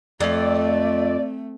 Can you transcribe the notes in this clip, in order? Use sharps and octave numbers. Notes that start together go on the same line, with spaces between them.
F2 A3 D5